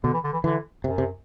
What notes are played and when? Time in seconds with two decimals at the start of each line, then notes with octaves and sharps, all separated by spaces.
0.04 B2 D3
0.14 E3
0.24 D3
0.34 E3
0.44 D3 E3
0.84 F#2 C3
0.98 C3